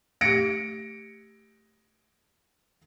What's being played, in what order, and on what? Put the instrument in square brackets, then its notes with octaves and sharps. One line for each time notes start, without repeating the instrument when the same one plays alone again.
[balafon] A3 G4 [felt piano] A#6 C#7 D7